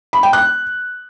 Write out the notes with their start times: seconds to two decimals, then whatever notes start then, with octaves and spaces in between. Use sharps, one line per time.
0.13 B5
0.23 G5
0.33 F#6